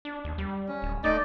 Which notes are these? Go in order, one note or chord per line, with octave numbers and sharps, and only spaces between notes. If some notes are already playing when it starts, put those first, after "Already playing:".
D4
D#2
G3
C#4
D1
A3 D#4 D5 D#5